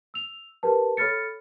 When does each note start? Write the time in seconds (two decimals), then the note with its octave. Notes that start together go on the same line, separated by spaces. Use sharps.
0.14 E6 F7
0.63 G4 A#4 B4 A5
0.97 A4 C#5 B5 F6 A6 C#7